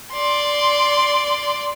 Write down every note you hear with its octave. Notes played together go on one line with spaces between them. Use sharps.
D5 C6